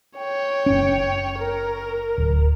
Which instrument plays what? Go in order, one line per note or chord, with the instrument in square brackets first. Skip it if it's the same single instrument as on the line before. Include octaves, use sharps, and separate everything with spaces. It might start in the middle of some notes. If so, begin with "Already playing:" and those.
[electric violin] C#5 G5
[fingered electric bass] F#1 C#4
[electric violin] A#4
[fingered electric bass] D1